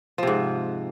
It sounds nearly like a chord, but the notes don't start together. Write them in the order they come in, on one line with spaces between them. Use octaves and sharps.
F3 C3 G#2